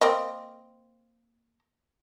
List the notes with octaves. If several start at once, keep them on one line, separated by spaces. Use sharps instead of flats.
A#3 C4 D#5